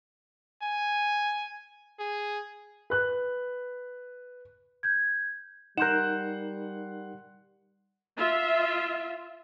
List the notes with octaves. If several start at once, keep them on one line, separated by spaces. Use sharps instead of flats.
G#5
G#4
B4 F#6
G6 G#6
G3 D#4 A#4 F#5 C6 F#6 G6 E7
F4 E5